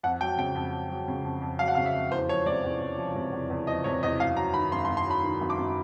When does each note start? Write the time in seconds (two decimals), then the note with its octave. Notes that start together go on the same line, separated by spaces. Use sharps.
0.03 F2 F#5
0.20 F#3 G5
0.38 C#3 G5
0.55 F2
0.72 F2
0.90 F#3
1.08 C#3
1.24 F2
1.42 F2
1.59 F#3 F5
1.68 F#5
1.75 C#3 F5
1.86 E5
1.95 F2
2.11 E2 C5
2.29 F3 C#5
2.46 C3 D5
2.64 E2
2.80 E2
2.98 F3
3.15 C3
3.32 E2
3.50 E2
3.67 F3 D#5
3.84 C3 C#5
4.03 E2 D#5
4.20 F#2 F5
4.36 F#3 A#5
4.54 D#3 B5
4.72 F#2 C6
4.85 C6
4.88 F#2
4.97 C6
5.06 F#3 B5
5.23 D#3
5.41 F#2
5.50 D6
5.58 F#2